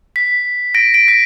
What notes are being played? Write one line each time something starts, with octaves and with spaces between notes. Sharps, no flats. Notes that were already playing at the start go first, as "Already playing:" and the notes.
B6
A#6 D7
A#6 D7
B6